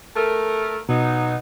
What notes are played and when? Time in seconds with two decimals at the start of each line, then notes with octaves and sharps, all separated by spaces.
0.16 A3 A#4
0.89 B2 F#3 B3 D#4